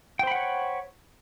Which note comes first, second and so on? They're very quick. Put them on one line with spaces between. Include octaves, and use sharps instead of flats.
G5 C5 B5 F#5 C#5